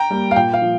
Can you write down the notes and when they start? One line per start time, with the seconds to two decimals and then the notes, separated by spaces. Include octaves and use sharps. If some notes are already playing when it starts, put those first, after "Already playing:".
Already playing: G5 A#5
0.10 G3 A#3
0.31 F5
0.36 A#2 G5
0.53 F5
0.62 F3